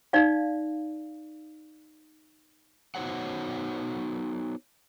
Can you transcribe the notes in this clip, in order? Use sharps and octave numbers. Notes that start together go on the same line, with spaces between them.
D#4 D5 F5
B3 D#4 F#4 C5 C#5 F#5